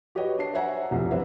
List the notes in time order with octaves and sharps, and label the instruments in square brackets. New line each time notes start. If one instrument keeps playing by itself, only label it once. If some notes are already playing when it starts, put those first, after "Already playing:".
[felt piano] F#4 G4 B4 C#5 D#5 G5
D4 C7
C5 C#5 E5 F#5 G#5 A#5
F1 C2 G2 F3
E3 G3 C4 B4 C5 E5